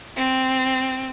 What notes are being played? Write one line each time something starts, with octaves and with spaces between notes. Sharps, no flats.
C4